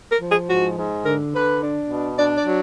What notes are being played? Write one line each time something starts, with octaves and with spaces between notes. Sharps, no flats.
A#4
F3
G#4
G#2 F#4
G#2
D3 A#4
D3 B4
D4
B2
D4 D5
D5
F#3